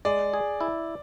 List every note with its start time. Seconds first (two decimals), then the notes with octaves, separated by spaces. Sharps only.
0.05 G#3 D5
0.33 G#4
0.61 E4